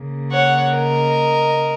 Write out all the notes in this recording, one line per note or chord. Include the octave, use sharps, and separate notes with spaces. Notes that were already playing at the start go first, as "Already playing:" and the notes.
Already playing: C#3 A#3
C#5 F#5
A#4 D#5